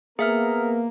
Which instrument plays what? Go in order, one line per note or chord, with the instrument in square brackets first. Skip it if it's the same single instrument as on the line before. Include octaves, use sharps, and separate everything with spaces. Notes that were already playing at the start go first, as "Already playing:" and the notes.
[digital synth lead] A#3 [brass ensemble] B3 A#4 [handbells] G#4 E5 F6